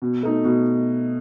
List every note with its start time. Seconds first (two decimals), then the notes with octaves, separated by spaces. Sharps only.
0.02 B2
0.23 A3 D#4
0.44 B2